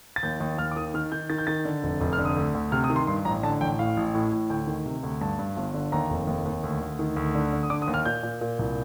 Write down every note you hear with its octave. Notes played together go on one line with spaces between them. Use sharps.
A6
D#2 G6
D#2
D#2 F6
D6
D#3 D#6
D#3 F6
D#3 G6
D#3 A6
G6
D#3 A6
D3
F1
F1
F6
D3
D#6
D2
D2
C3 F6
D#6
D#3
C6
G2 C6
A1 A#5
D3 A5
A1 G5
A2 F5
A1
A2
A2
D2 G5
D#3
C3
D2
G2 A5
G2
G1
D3
D#2 A#5
F1
D#2
D#2
D2
D2
D#3
D2
D3
D3
D#6
D3 D6
D#6
D#2
F6
A#2 G6
A#2
A#2
C2